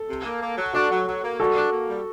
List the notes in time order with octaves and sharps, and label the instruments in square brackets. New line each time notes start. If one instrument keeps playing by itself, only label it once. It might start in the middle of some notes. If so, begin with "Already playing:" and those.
Already playing: [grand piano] A4
[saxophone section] C3
A#3
A#3
F#3
[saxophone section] D4 [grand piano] F#4 A4
[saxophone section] F#3
F#3
A#3
[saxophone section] G3 [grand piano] F#4 A4
[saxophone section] D4
A#3
G3